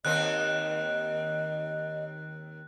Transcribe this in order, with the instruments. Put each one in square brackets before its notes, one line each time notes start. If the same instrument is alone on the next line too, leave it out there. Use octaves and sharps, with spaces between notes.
[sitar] D#2 D#3 C4 [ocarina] D#5 [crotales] F#6